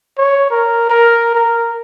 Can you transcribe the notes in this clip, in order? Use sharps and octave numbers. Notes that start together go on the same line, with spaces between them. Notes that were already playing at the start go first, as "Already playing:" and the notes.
C#5
A#4
A#4
A#4